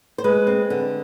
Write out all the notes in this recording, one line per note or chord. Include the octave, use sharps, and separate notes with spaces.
C5
G#3 B4
C4
D3